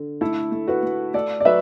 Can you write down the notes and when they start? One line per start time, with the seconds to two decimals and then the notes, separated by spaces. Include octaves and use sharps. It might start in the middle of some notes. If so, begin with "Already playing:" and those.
Already playing: D3
0.21 A3 E4 A4
0.52 A3
0.68 F#4 B4
0.83 A3
1.14 A3 A4 D5
1.40 D5
1.45 F#3 B4 E5